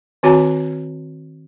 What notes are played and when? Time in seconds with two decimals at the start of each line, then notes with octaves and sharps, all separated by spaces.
0.23 D#3 C4 F#4 C#5 G#5 A#5